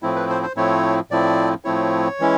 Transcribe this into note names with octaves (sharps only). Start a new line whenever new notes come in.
A2 F3 A3 C4 E4
B4
C5
C5
A2 F3 A3 C4 E4 C#5
A2 F3 A3 C4 E4 D5
A2 F3 A3 C4 E4 C#5
E3 G#3 C#4 E4